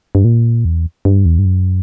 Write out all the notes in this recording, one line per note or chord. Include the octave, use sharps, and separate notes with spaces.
G2
A#2
E2
G2
E2
G2
F#2